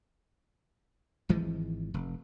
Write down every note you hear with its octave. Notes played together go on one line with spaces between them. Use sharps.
G#1 E3 F3 G#3
F1